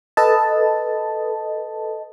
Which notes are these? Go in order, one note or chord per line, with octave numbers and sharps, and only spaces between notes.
A4 B4 D#5 A5